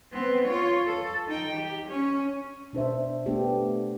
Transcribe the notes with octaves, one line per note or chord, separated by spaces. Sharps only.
B3 C4
F4 C#5
A4
D#4 G5
G4
C#4
B2 D4 C5 E5
A3 B3 D4 G4